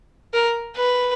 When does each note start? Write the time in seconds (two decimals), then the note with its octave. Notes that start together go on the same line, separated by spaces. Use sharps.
0.34 A#4
0.76 B4